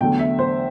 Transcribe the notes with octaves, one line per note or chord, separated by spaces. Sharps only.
E2 D3 F#3 A3 G5
E5
C5